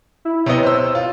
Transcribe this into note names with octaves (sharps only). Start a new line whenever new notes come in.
E4
C3 B3 C#5 D#5
C5 E6
F4